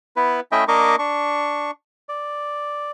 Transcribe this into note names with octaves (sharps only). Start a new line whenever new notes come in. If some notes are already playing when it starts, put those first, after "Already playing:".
B3 E4 B4
A3 C#4 E4 D#5 E5 G5
A#3 D4 A#4 D#5 C#6 D6
D4 C#6
D5